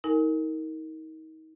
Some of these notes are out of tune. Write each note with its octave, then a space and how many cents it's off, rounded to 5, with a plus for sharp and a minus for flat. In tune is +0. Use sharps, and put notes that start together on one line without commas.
D#4 +35 A#4 -15 G#5 +0